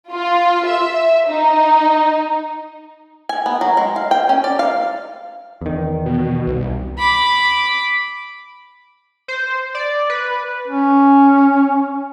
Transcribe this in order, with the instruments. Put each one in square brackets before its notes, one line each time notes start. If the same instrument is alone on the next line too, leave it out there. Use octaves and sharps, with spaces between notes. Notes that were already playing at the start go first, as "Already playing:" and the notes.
[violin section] F4
E5
D#4
[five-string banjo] G#5
B3
F#3
G#3
F5
G5
C#4
D5
F5
[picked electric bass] E2 D#3
[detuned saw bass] B2
C2
[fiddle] B5 D6
[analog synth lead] C5
D5
B4
[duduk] C#4